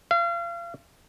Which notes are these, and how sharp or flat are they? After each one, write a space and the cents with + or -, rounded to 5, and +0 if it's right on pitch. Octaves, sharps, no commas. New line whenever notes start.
F5 -35